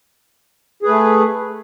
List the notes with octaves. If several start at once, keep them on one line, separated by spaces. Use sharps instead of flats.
A3 G#4 B4